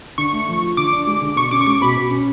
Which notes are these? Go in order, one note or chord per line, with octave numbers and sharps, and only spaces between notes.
D3 C#6
A3
F3
F4
D3 D6
D4
G#3
D3
B2 C#6
C#4 D6
C#6
G#3 D6
B2 B5
B2
C#4